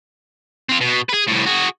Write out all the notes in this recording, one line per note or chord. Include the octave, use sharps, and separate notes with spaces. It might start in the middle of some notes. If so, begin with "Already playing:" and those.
C4 F4
B2
G#4 B4
C2 A2
F#4 G#4